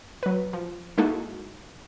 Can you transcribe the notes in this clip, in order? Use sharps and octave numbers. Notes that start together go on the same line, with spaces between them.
F#3 B4
F3
G#3 A#3 D#4 E4 F#4 A4